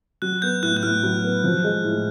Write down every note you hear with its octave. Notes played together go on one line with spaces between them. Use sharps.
F#3 F#6
B3 G6
A2 F#6
F#6
A2 F6
F#3
B3
F3
G#3
A2